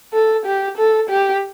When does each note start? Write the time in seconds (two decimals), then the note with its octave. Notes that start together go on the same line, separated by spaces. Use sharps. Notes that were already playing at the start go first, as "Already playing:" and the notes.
0.13 A4
0.45 G4
0.77 A4
1.10 G4